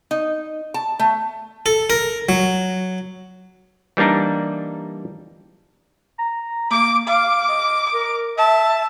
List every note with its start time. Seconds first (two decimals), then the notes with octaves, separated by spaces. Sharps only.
0.11 D#4
0.74 A5
0.99 A3
1.66 A4
1.90 A#4
2.29 F#3
3.97 E3 G3 A#3 D4 D#4
6.19 A#5
6.71 A#3 D6
7.08 F5 D6
7.48 D#5
7.93 A#4
8.38 E5 A5